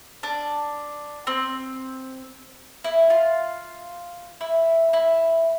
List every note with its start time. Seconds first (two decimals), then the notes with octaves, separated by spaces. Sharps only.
0.23 D4
1.27 C4
2.84 E4
3.10 F4
4.41 E4
4.93 E4